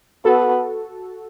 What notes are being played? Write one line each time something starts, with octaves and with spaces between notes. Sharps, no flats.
B3 F#4 A4